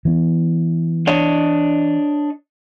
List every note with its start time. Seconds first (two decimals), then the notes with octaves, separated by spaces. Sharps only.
0.05 E3 B3
1.07 D4 C#5 D#5